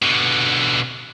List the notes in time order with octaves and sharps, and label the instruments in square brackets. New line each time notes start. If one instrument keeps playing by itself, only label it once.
[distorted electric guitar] B2 D3